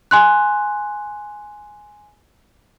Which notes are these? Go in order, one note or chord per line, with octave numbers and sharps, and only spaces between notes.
G#5 C6 F#6